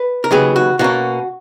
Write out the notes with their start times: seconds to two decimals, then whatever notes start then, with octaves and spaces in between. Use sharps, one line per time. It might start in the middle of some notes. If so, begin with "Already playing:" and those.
Already playing: B4
0.24 A#4
0.31 D#2 C#3 F#3 B3 G#4
0.56 F#4
0.79 B2 A#3 C#4 F#4